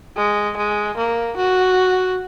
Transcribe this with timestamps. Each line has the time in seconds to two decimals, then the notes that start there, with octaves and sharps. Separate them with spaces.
0.17 G#3
0.57 G#3
0.97 A#3
1.37 F#4